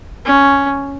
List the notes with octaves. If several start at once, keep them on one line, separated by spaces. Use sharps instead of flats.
C#4